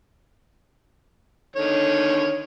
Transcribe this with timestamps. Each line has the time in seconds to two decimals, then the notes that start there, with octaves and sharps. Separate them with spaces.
1.56 D3 D#3 C#5